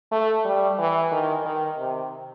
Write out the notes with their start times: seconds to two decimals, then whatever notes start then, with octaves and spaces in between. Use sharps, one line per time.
0.11 A3
0.45 G3
0.79 E3
1.12 D#3
1.45 D#3
1.78 C3